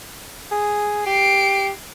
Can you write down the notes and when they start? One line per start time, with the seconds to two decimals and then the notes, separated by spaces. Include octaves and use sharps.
0.51 G#4
1.06 G4 C7 D7